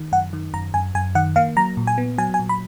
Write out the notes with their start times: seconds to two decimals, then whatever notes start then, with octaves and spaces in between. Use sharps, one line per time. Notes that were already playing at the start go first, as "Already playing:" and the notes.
Already playing: D#3
0.12 F#2 F#5
0.33 D#3
0.54 F#2 A#5
0.74 F#2 G#5
0.95 F#2 G#5
1.15 D#3 F#5
1.36 A#3 F5
1.57 F#3 A#5
1.77 A#2
1.87 G#5
1.98 B3
2.18 F#3 G#5
2.34 G#5
2.39 A#2
2.49 B5